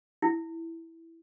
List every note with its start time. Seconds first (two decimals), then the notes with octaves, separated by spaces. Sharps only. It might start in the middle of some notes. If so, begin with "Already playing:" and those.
0.22 E4